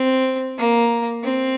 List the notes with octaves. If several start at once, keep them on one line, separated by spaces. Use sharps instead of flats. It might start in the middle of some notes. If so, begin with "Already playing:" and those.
Already playing: C4
A#3
C4